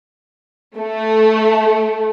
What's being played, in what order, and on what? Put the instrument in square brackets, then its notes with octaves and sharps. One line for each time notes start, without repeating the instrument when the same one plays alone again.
[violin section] A3